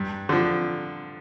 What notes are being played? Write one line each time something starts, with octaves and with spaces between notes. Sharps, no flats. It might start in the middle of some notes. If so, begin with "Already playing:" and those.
Already playing: G2
D3 F3